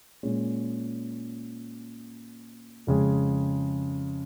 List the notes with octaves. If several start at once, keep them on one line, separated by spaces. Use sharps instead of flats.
A#2 G#3 C#4
F2 C#3 G#3